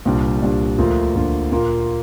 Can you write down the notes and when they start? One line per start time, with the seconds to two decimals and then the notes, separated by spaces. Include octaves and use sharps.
0.05 C2 A#2 G3 D4
0.42 C2 A#2 G3 D4
0.78 D2 D3 F3 A#3 F4
1.15 D2 D3 F3 A#3 F4
1.51 A#2 A#3 F4